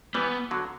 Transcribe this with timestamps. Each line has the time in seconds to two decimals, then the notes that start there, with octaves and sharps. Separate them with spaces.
0.14 E3 G3 B3
0.51 D3 F#3